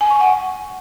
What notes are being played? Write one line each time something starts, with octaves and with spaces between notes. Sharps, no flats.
G#5
C#6
F#5